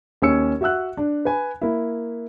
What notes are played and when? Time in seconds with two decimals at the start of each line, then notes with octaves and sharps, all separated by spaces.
0.22 D#2 C#4 C#5 E6 C#7
0.61 F#4 E5 F#5 E6 F#6
0.97 D4
1.25 B4 G#5
1.61 A#3 E4